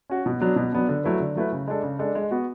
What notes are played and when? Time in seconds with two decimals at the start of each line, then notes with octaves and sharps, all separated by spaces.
0.10 C#4 F#4
0.26 B2
0.40 F#3 B3 D4
0.56 B2
0.72 F#3 B3 D4
0.89 D3
1.04 F#3 A3 E4 B4
1.20 D3
1.35 F#3 A3 E4 B4
1.52 C#3
1.68 G#3 D4 A4
1.83 C#3
1.99 G#3 D4 A4
2.15 G#3
2.31 B3 F#4